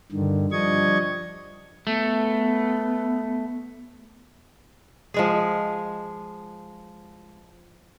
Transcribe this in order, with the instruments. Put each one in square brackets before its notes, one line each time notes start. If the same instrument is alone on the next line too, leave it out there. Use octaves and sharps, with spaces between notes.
[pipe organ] G2 D3 D#3
F3 G3 D4 D#5 C#6 G#6
[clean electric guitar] A3 [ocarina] B3
[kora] F3 G#3 G#4